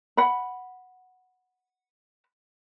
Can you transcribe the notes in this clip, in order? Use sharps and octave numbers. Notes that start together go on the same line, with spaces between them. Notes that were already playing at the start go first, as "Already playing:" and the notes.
F#5 B5